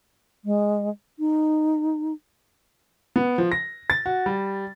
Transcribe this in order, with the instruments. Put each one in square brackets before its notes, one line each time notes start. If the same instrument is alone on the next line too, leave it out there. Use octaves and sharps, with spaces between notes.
[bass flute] G#3
D#4
[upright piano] B3
F3
A#6
A6
F#4
G3